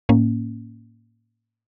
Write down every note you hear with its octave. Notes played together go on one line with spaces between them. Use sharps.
A2 A#3 C#4